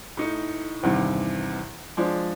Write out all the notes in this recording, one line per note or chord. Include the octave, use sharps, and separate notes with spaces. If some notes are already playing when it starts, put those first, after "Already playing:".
A2 D#4 C#7
E2 G2 C3 D#3
F3 G#3 D4